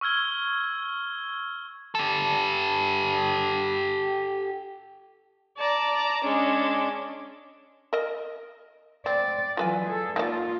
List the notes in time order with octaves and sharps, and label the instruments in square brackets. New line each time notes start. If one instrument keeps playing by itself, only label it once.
[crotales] C#6 E6 F6 G#6 G7
[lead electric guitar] G4 A4
[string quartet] D5 A5 A#5
G#3 C#4 D4
[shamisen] A#4 D#5
[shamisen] C4 [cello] D5
[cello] E3 F#3 [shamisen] F4 B4 G#5
[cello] G#4 A4
[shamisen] D#3 F#4 D5 [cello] A#3 F4